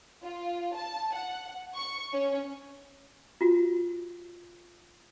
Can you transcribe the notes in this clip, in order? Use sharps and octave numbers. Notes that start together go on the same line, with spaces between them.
F4
A5
F#5
C#6
C#4
F4 F#4